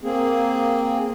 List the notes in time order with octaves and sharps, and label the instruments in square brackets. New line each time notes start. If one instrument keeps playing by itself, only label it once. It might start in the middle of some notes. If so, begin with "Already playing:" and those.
[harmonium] A#3 C4 G#4